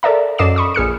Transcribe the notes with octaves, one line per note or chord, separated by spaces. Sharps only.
A4 A#4 D5 E5 A#5
F#2 A4 D#5 D6 C7 E7
B5 C#6 D#6
A#1 G#4 F6 C#7